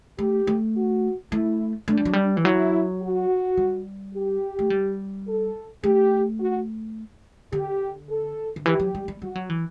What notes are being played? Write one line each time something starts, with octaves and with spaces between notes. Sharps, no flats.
A3 G4
A3
F#4
A3 E4
A3 D4
G3
F#3
G3
E3
F#3 E4
F#4
G3
G4
A3
G3
A4
A3 G4
F#4
D3 G4
A4
D3
E3 G4
F#3
G3
G3
G3 F#4
F#3
E3